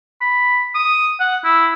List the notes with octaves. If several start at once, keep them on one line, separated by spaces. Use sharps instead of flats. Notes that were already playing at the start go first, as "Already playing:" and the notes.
B5
D#6
F#5
E4